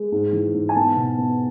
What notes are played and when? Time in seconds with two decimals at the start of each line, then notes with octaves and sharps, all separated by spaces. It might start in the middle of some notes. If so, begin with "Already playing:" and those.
Already playing: G#3
0.12 G#2
0.33 E3
0.54 G#2
0.69 G#5
0.75 B3 A5
0.96 B2
1.18 B3